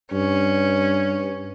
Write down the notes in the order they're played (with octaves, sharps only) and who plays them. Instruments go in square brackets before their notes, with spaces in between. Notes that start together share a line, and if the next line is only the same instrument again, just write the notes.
[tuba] G2 [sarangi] C#4